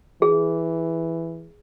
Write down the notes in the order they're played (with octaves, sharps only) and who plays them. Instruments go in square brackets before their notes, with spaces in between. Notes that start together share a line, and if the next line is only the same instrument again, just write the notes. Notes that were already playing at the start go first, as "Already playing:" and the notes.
[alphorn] E3 [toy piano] G#4